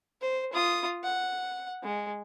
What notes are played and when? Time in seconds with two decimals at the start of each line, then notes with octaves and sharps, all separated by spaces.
0.21 C5
0.53 F4 D#6
1.04 F#5
1.83 G#3